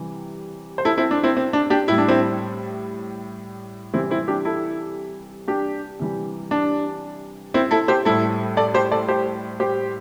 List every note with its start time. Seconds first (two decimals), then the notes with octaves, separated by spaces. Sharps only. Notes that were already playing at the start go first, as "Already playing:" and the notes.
Already playing: C3 E3 G3
0.78 C5
0.85 E4 A4
0.98 C4 E4
1.11 D4
1.23 C4 E4
1.37 C4
1.53 D4
1.70 D4 G4
1.88 A2 G3 E4
1.98 D4
2.08 C4 E4
3.94 C3 E3 G3 C4 E4
4.10 C4 E4
4.28 D4 G4
4.45 E4 A4
5.48 D4 G4
6.00 C3 E3 G3
6.51 D4
7.54 C4 E4
7.71 E4 A4
7.88 G4 C5
8.05 A2 G3 E4 A4
8.57 A4 D5
8.74 G4 C5
8.92 A4 D5
9.08 G4 C5
9.60 G4 C5